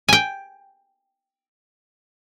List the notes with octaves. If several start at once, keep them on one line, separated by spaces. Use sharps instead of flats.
G5 G#5